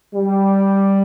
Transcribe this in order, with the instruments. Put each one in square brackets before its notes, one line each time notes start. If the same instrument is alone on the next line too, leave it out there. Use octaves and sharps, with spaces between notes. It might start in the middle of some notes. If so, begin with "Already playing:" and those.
[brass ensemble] G3